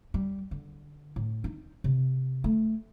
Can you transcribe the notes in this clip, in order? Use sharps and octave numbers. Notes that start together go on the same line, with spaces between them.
G3
D3
A2
D#4
C3
A3